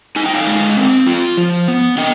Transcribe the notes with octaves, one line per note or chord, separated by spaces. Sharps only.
D#4 G#5
G5
F5 G#5
G#3
C4
F4
F3
B3
D4 D#5 G5